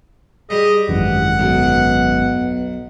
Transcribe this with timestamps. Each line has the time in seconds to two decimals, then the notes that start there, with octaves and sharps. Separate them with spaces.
0.50 G3 G#4 D#5
0.89 G#1 F#2 E3 F#5
1.39 B1 B3